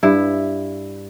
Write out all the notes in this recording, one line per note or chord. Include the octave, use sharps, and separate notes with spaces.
G2 E4